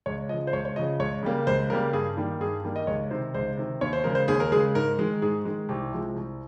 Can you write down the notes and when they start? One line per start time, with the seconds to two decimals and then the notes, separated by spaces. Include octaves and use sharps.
0.06 C#2 C#5
0.29 F3 D#5
0.34 C#3
0.47 C5
0.53 C#2 C#5
0.65 C#5
0.76 C#3 F3 D#5
1.00 C#2 C#5
1.23 C#3 G3 A#3
1.47 C#2 C5
1.70 C#3 G3 A#3 A#4
1.93 G2 G#4
2.17 D#3 G3 A#3
2.40 G2 G#4
2.64 D#3 G3 A#3
2.76 D#5
2.87 C#2 C#5
3.10 C3 D#3 C5
3.34 C#2 C5
3.57 C3 D#3
3.81 D#2 C#5
3.93 C5
4.04 C#3 G#3 A#4
4.15 C5
4.28 D#2 G#4
4.40 A#4
4.52 C#3 G#3 G#4
4.75 G#2 A#4
4.99 D#3 G#3
5.22 G#2 G#4
5.45 D#3 G#3
5.69 C2 G4
5.92 C3 F3 G#3
6.16 C2